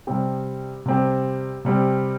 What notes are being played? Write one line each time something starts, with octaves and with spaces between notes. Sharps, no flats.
C3 G3 C4 G4
C3 G3 C4 G4
C3 G3 C4 G4